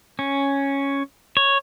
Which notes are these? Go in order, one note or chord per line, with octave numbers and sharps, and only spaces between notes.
C#4
C#5